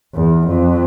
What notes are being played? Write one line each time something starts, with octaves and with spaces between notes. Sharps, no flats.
E2
F2